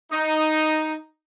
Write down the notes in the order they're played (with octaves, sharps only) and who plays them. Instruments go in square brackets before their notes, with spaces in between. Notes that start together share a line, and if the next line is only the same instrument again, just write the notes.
[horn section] D#4